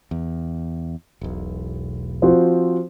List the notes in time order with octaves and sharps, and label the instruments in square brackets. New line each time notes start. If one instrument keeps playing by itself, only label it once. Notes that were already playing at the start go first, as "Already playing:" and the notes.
[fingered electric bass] E2
E1 B1
[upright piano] F3 C4 F#4